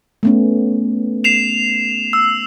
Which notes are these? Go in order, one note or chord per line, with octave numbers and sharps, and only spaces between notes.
A3 B3 C#4
C7 E7 F7
E6